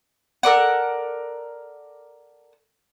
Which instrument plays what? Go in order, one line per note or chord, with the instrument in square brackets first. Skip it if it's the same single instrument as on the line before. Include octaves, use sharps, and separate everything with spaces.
[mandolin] A4 A#4 D5 F#5